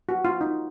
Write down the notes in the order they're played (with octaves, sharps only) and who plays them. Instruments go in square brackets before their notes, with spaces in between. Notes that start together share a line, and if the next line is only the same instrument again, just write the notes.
[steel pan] F#4
F4
D#4